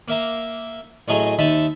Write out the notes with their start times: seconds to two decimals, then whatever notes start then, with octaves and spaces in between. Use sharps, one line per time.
0.08 A#3 E5 A#5
1.08 A1 F#3 A3 G#4 D#5 A#5
1.39 D#2 D#4 E5 A5 B5